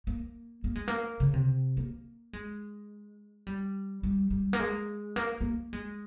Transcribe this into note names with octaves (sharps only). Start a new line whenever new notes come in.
A#3
A#3
G#3
A#3
C#3
C3
A#3
G#3
G3
G3
G3
A#3
G#3
A#3
A#3
G#3